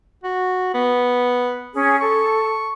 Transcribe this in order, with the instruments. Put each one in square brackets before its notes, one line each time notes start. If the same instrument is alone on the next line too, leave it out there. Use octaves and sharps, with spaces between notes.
[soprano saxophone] F#4
B3
[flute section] C#4 G#4
[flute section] A4 [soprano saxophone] C#6